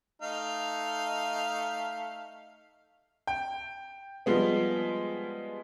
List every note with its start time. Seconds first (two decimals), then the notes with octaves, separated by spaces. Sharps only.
0.22 A3 D#4 F5
3.27 G5
4.26 F3 G3 G#3 B3